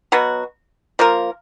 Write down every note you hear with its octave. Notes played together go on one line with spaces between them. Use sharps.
B2 F#3 B3 F#4
F3 A#3 F4 A#4